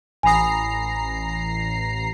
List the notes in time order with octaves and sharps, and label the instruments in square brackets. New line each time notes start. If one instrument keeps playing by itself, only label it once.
[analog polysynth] A1 A#5 C7 [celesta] G#5 B5 D#6